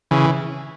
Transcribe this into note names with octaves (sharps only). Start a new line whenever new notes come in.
C#3 E3